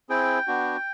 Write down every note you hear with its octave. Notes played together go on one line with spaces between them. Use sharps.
C4 E4 G#4 G5
B3 D4 F#4